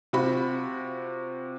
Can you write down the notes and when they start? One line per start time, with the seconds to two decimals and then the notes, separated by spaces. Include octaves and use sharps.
0.13 C3 F4 F#4 B5 C#6